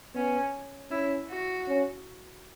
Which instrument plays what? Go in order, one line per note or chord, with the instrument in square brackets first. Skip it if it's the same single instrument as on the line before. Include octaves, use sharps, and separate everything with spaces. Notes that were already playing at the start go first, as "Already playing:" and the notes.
[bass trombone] B3 [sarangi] C#4
[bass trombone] C#4 [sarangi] E4
[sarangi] F#4
[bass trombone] C#4